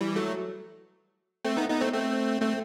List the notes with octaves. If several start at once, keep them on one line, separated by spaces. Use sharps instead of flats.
E3 G3
F#3 A3
A3 C4
B3 D#4
B3 D#4
A3 C4
A3 C4
A3 C4